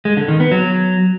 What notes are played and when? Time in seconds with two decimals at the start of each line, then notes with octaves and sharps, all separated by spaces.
0.05 G#3
0.17 D3
0.28 D#3
0.40 B3
0.52 F#3